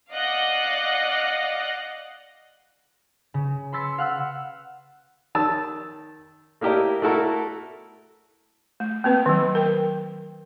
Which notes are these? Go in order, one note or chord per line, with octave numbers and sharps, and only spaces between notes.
D5 D#5 F5 F#5 F#6 A#6
C#3
B5 C6 E6 A6 B6 C#7
F5 F#5 E6
D#3 A5 E6
A3 A#3 E4 G4 A#4 D#5
A3 E4 F#4 A4 A#4
A3
A#3 C4 B4
D#3 F#3
A#4 G5